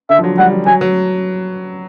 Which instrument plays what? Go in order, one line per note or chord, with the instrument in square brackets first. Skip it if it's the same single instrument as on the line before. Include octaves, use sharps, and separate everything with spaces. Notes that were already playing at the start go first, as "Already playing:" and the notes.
[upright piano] D3 [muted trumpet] E5
[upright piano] F3
F#3
[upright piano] G3 [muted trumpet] F#5
[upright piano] F#3
[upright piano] F#3 [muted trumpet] G#5
[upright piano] F#3